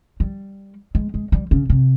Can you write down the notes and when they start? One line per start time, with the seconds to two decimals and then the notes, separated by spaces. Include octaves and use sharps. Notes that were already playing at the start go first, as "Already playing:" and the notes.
0.20 G3
0.95 G#3
1.14 G#3
1.32 G3
1.51 C#3
1.70 C3